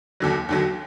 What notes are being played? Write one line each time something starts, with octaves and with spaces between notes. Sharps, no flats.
D#2 D3 F#3
D#2 D3 F#3